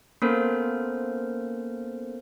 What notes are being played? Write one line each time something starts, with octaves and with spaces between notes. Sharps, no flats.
A#3 B3 C#4 A4 A#4 C5